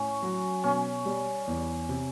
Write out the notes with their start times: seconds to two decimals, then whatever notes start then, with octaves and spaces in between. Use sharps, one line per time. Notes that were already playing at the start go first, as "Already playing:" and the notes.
Already playing: A2 C#4
0.22 F#3
0.64 B2 C#4
1.06 G3
1.47 E2
1.89 C3